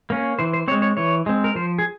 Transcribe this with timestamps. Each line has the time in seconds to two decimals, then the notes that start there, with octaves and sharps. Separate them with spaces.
0.10 A#3 C#4
0.39 E3 C5
0.53 C5
0.68 C4 C#5
0.72 G#3
0.82 C#5
0.97 E3 C#5
1.26 G#3 C4
1.44 A#4
1.55 F3 C5
1.79 G#4